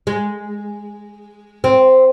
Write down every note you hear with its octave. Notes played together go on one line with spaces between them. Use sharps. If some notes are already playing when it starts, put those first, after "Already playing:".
G#3
C4